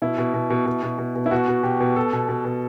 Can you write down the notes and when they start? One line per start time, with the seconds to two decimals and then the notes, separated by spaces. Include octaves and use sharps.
0.02 B2 E4
0.18 B2
0.34 B2
0.50 B2
0.66 B2
0.83 B2
0.98 B2
1.15 B2
1.26 E4
1.31 B2 F#4
1.48 B2
1.63 B2 G4
1.80 B2
1.96 B2 A4
2.13 B2
2.29 B2
2.45 B2